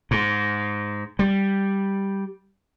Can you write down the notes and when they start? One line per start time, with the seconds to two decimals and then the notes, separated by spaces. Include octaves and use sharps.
0.11 G#2
1.19 G3